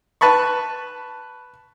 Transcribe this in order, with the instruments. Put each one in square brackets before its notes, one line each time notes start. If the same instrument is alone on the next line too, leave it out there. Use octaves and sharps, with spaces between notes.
[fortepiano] B4 A5 B5 C#6